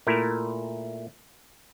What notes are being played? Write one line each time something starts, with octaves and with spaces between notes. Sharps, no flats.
A#2 A3 E4 A#4